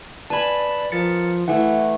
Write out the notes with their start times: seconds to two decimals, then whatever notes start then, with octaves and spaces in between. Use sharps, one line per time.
0.30 B4 D5 G#5 A5 B5
0.92 F3 A#4 A6 C#7
1.48 E3 A3 E4 F#5